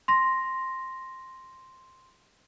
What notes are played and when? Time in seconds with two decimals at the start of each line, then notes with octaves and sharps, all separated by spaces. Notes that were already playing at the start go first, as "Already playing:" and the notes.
0.08 C6 A#6